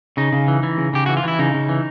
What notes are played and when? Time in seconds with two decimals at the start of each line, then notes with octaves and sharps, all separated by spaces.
0.17 C#3 D#4
0.33 C#3
0.48 E3
0.63 E3
0.78 C#3
0.93 C#3 G4
1.06 E3 F#4
1.17 F4
1.23 E3 E4
1.39 C#3 D#4
1.54 C#3
1.69 E3